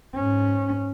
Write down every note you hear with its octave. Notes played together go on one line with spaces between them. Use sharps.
G#2 C#4